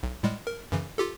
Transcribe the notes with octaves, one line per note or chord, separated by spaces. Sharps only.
B1
A2 G3 G#3
A#4
F#2 C#3 E3
F4 G4 A4